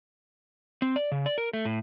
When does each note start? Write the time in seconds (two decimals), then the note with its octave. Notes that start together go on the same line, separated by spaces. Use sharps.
0.82 C4
0.96 D5
1.12 C#3
1.26 D5
1.38 A#4
1.53 A3
1.65 A2